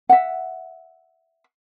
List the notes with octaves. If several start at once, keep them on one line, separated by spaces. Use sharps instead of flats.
E5 F#5